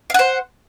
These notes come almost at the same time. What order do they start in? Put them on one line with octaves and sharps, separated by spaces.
F5 F#5 C5